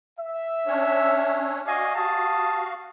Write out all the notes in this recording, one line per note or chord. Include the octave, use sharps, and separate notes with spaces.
E5
C#4 D4 C#5
F#4 D5 D#5 F5 G#5
G4 A5 D#6